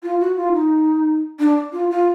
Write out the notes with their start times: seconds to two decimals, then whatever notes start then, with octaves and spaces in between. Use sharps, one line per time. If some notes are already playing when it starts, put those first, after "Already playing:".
0.03 F4
0.20 F#4
0.37 F4
0.53 D#4
1.39 D4
1.73 F4
1.90 F4